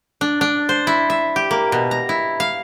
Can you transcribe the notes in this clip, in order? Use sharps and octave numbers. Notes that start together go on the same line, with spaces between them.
D4
D4
C5
E4
E5
G4
A#3
B2
A#5
E4
F5